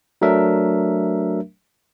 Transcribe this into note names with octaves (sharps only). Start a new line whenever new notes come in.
F#3 A3 D4 A#4 E5